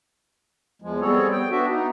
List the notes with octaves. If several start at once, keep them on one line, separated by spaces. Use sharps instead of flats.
E2 F3 G#3
G3 B3 C4 G#4 A4 C#5
G5
B3 D4 F#4 E5
B3 D#4